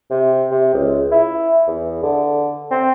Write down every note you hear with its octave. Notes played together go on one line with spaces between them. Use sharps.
C3
C3
C#2
E4
E2
D3
C4